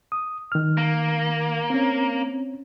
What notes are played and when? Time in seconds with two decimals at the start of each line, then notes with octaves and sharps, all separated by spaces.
0.12 D#6
0.52 D#3 F6
0.78 A#3
1.70 C4 C#4